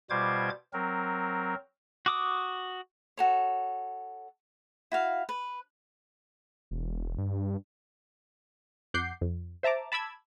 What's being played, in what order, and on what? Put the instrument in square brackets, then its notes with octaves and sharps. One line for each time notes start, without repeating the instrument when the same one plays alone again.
[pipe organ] B2 G3 F4 C5 D6 G#6
F#3 C4 A#4
[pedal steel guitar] F#4 D6 D#6
[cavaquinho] F#4 A4 C#5
E4 F#4 F5
B4
[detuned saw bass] E1
G2
[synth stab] F2 F#5 D6 G6 C7
F2
C5 E5 A5 A#5 D6
A5 B5 D6 E6 G#6